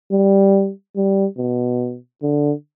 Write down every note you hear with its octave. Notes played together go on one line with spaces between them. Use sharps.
G3
G3
B2
D3